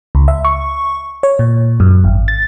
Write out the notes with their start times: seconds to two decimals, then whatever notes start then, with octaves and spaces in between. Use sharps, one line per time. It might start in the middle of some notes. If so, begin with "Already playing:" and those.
0.15 C#2
0.28 E5
0.45 C#6
1.23 C#5
1.39 A#2
1.80 F#2
2.04 G#1
2.28 A6